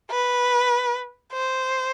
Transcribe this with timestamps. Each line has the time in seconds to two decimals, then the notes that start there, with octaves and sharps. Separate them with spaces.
0.11 B4
1.33 C5